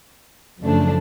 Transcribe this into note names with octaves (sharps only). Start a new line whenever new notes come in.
F#2 C#3 F3 A3 D4